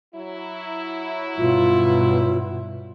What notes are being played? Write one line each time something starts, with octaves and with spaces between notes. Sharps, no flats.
F#3 E4
G2 B2 F4